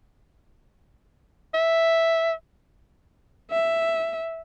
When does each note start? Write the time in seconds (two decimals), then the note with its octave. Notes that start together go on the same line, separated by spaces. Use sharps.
1.54 E5
3.51 E5